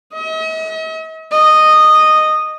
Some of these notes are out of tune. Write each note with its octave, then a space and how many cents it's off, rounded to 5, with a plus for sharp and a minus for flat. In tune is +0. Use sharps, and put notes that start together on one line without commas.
D#5 +45
D#5 -10